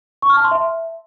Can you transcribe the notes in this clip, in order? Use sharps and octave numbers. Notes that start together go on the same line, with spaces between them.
C#6
F6
A5
C6
E5